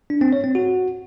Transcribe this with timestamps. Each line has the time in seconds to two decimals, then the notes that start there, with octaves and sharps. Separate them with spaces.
0.10 D4
0.21 C4
0.33 C#5
0.44 C4
0.55 F#4